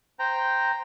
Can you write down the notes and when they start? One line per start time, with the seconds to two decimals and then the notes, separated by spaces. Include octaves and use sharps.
0.19 C5 G5 A#5